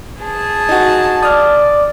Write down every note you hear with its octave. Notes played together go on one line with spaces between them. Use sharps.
G#4 A5
D#4 F#4
D5 D#6 F6